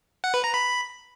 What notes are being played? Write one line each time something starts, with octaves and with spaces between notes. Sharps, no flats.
F#5
B4
A#5
B5